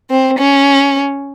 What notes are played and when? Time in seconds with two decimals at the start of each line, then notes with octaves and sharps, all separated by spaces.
0.11 C4
0.39 C#4